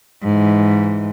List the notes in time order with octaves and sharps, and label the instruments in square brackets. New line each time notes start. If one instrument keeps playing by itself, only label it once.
[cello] G#2 E3